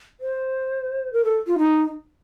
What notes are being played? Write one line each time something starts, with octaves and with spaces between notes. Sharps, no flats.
C5
A#4
A4
F4
D#4